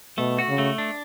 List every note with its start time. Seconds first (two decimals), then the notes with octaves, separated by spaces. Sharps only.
0.18 B2 A3
0.39 F#4
0.49 C#3
0.58 A3
0.78 D4